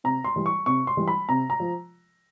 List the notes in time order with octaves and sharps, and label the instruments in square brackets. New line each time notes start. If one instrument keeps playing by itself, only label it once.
[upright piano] C3 A#5
C6
E3 G3
C#6
C3 C#6
C6
E3 G3
B5
C3 A#5
A#5
F3